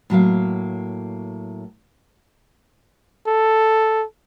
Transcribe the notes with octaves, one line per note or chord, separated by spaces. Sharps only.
A2 F#3 A#3 F5
A4